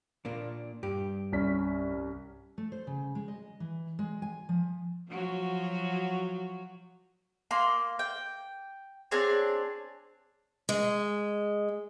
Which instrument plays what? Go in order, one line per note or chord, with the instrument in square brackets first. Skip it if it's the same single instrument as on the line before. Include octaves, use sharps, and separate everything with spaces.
[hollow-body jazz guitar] A#2 A#3 D4
G2 G4
[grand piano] C2 C#4 B6
[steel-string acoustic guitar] A3
C5
C#3
G#3
D#5
E3
G#3
G#5
F3
[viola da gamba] F3 F#3 F#4
[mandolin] A#3 C6
G5
C4 D4 G#4 C#5
[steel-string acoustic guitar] G#3